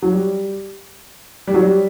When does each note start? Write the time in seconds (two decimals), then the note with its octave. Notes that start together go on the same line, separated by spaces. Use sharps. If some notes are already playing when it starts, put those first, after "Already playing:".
0.02 F#3
0.12 G3
1.47 G3
1.54 F#3
1.62 G3